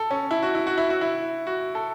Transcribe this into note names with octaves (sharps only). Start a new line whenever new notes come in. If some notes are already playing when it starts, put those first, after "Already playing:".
Already playing: A4
C#4
E4
F#4
E4
F#4
E4
F#4
E4
F#4
A4